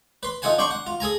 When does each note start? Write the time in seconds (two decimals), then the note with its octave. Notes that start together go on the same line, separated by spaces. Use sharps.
0.23 B4 C6
0.42 D#4 F4 A4 F#5 G#5 A5
0.58 D4 G5 A5 C6 C#6
0.71 F#5
0.87 F4
1.00 G#4 A4 G#5 A#5